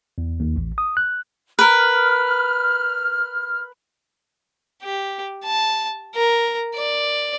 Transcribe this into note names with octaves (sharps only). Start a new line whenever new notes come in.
E2
D#2
A1
D#6
F#6
A#4 B4 F6
G4
A5
A#4
D5